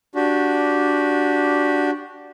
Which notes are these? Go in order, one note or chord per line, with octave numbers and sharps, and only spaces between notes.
D4 F#4 G4